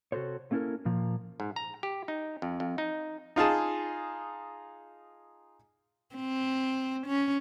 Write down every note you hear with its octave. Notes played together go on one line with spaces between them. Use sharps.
C3 F#4 G4 A4 C5 C#5
A3 A#3 C#4 E4 A4 A#4
A#2 F3 A#3
G#2
A#5
G4
D#4
F2
F2
D#4
D#4 F4 G#4 A5
C4
C#4